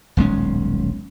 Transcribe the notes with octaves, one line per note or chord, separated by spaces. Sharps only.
D#1 B1 G#3 C#4